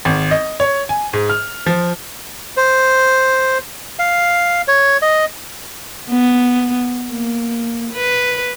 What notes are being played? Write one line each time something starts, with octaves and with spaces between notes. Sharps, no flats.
G#1
D#5
C#5
G#5
G#2
F6
F3
C5
F5
C#5
D#5
B3
A#3
B4